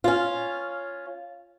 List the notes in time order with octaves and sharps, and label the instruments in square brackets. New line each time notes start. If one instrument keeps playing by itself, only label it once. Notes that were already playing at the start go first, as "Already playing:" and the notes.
[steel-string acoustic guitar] C#4 F4